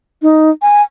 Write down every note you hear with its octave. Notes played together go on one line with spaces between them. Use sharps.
D#4
G#5